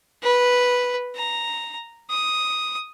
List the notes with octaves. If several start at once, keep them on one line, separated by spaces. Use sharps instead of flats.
B4
A#5
D#6